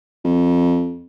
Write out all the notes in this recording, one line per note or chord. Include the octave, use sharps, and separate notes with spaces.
F2